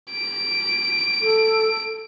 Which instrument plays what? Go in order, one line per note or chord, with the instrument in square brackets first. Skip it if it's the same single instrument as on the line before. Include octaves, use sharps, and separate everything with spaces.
[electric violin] D7
[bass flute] A4